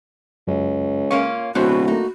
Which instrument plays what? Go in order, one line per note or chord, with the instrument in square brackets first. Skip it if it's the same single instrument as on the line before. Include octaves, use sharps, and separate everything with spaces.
[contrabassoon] C#2 [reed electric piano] F#2
[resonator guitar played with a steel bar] A#3 C#4 F4 [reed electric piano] C#5 C#6
[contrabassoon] D1 [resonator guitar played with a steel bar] G#2 B2 B3 [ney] F#4 [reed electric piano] C5 F#5
[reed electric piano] A3 A#3 [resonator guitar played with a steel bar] D#4